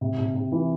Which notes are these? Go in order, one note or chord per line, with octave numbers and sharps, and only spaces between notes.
C3
C3
C3
E3